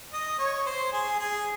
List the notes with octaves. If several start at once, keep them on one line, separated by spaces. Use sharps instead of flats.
D#5
C#5
C5
G#4
G#4